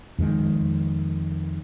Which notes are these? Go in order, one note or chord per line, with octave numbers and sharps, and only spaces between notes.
F2 D#3 G#3